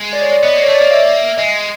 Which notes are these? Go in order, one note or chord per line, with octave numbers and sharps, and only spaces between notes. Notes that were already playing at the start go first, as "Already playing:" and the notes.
Already playing: G#3
D5
C#5
D5
B3 D#5
A#3
C#5
A3 D5
A#3 D#5
E5
G#3 D#5